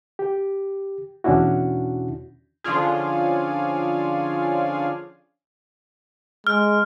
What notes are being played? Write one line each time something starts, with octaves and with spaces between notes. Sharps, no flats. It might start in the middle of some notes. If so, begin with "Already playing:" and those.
G4
E2 B2 C#4 D4 E4 F#4
D3 F3 C#4 D4 F4 G#4
G#3 F6